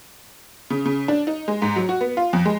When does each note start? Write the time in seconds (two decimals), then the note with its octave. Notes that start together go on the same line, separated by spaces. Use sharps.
0.70 C#3
0.85 C#3
1.08 D4
1.27 D#4
1.48 G#3
1.62 G#2
1.76 F#3
1.89 F#4
2.01 B3
2.17 F4
2.33 F2
2.45 G#3